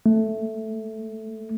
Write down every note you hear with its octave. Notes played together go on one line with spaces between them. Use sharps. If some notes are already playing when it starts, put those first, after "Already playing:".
A3